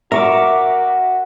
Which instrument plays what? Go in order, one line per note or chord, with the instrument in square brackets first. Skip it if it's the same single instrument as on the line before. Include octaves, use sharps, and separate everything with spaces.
[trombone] F#4 [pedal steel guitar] A#4 C#6 D6 [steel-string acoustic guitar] E5